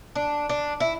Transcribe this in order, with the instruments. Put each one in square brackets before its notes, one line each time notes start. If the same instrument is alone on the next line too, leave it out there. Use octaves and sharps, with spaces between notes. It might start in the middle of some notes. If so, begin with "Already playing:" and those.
[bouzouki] D4
D4
E4